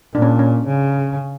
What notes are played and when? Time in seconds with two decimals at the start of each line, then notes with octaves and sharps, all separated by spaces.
0.14 A#2 D4
0.22 C#4
0.39 C#4
0.68 C#3